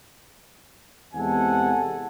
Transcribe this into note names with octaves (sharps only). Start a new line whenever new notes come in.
E2 C3 G#3 A4 F#5 G#5